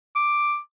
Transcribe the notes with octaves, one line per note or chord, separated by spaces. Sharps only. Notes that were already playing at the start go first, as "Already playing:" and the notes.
D6